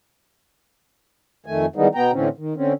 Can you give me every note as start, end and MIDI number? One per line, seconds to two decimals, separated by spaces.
1.46 1.66 41
1.46 1.66 51
1.46 1.66 57
1.46 1.66 80
1.76 1.88 51
1.76 1.88 52
1.76 1.88 55
1.76 1.88 56
1.76 1.88 59
1.76 1.88 63
1.95 2.11 47
1.95 2.11 59
1.95 2.11 79
1.95 2.11 82
2.12 2.28 45
2.12 2.28 50
2.12 2.28 52
2.12 2.28 60
2.12 2.28 61
2.37 2.54 51
2.56 2.73 50
2.56 2.73 60
2.56 2.73 61